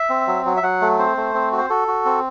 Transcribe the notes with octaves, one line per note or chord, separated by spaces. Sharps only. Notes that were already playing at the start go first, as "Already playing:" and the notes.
Already playing: E5
C4
F#3
F#3
E5
F#3 F#5
A3
C4 C5
A3
C4
F#4
C5
F#4 A4
F#4
C4